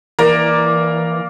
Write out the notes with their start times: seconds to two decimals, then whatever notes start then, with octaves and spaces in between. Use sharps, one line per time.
0.19 E3 A#3 A#4 D5